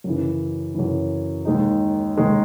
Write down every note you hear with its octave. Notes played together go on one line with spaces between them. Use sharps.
F#2 C#3 E3
F#2 C#3 E3
D#2 D#3 G#3 D#4
D#2 D#3 G#3 D#4